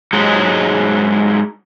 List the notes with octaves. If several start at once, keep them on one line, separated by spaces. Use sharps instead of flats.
G#2 F#3 G#3